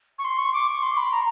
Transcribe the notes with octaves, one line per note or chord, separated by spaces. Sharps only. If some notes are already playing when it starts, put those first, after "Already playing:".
C#6
C6
C#6
D6
C#6
C6
B5
A#5